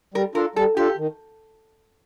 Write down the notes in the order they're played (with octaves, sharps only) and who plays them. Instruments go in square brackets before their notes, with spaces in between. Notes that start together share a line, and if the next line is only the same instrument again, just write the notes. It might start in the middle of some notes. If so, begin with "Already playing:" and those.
[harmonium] G3 [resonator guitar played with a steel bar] A#4
[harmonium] D4 F4 A4 [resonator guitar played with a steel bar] A#4
[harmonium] G3 [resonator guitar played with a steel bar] A4
[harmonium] D4 F4 A4 [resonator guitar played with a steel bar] G4
[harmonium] D#3